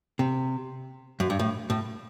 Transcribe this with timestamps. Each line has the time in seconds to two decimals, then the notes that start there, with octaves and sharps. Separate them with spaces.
0.19 C3
1.20 F#2
1.30 G2
1.39 A2
1.70 A2